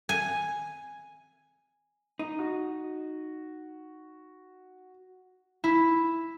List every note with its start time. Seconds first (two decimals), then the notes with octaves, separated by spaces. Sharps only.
0.09 G#5
2.19 D#4
2.39 F#4
5.64 E4